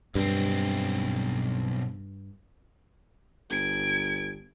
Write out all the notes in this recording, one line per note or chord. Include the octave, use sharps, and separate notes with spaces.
B1 G2 C4
G1 G#6 D7